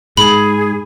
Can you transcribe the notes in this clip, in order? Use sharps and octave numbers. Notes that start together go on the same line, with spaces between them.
G#2 G#4 B5